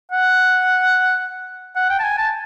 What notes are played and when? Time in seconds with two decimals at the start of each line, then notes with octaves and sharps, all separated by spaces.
0.12 F#5
1.76 F#5
1.90 G5
1.99 A5
2.04 G#5
2.18 A5